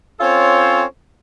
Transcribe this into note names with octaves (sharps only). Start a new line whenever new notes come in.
C4 C#4 F4 A4 C5 C#5